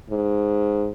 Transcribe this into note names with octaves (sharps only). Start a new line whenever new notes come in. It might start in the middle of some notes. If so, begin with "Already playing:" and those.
G#2